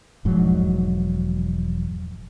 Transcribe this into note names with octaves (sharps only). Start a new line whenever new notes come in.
E1 G#2 F3 F#3